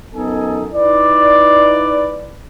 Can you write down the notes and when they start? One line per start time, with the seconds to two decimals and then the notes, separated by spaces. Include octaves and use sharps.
0.15 F#2 B3 D#4 A4 D#5 G#5
0.73 D#4 E4 B4 D5